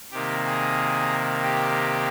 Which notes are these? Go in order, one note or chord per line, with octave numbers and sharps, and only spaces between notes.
C3 D#3 A#3 G4
G#4
G4